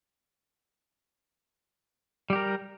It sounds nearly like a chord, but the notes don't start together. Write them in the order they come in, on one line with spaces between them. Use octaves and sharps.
G3 G4 A#4